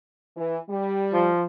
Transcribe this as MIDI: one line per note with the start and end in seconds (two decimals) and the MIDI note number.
0.37 0.56 52
0.69 1.29 55
1.13 1.44 53